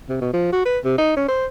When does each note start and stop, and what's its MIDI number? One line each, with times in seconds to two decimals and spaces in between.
0.09 0.18 48
0.21 0.32 47
0.33 0.50 53
0.53 0.64 66
0.66 0.78 71
0.85 0.97 48
0.98 1.12 63
1.17 1.26 61
1.28 1.47 72